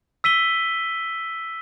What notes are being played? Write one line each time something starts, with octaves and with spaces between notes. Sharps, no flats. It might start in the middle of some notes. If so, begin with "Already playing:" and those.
E6 B6 D#7 G7